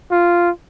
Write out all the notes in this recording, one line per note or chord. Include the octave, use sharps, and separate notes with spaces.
F4